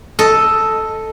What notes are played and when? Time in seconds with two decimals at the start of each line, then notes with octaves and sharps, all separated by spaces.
0.19 A4 D#5